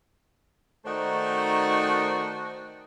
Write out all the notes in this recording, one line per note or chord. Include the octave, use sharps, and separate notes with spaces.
D#3 A3 D#4 F#4 C5 D5